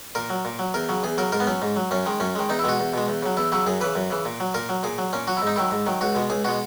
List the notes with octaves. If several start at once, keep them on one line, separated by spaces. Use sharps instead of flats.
A#2 A#4
F#3
A#2
F#3
E2 A#4
C#3 F#3
E2 G#4
C#3 F#3 A#4
G#2 A#4
B3
F#3 C#4
G#2
F#3
F#2 C#4
D#3 G#3
F#2 C#4
D#3 G#3
E2 D#4
E4
B2 G#3 F#4
E2
B2 G#3
E2
C#3 F#3
E2 E4
C#3 F#3 E4
F#2 G#4
C#3 E3 B4
F#2
C#3 E3
A#2
F#3
A#2 A#4
F#3
A#2 G#4
F#3
A#2 C#4
F#3 F#4
E4
G#2 D#4
D#3 F#3 E4
G#2
D#3 F#3
C#2 F#4
B2 G#3
C#2 G#4
B2 G#3 F#4